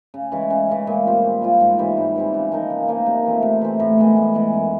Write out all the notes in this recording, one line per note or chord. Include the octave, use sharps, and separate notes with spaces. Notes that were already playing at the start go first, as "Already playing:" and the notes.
C#3
E3 G#3 C#4
C#3
E3 G#3 C#4
A#2
G3 C4 F4
A#2
G3 C4 F4
G#2
E3 G3 C4
G#2
E3 G3 C4
C#3
F3 A#3 D#4
C#3
F3 A#3 D#4
C3
E3 A3 C4
C3
E3 A3 C4
A2
E3 G#3 B3
A2
E3 G#3 B3
F#2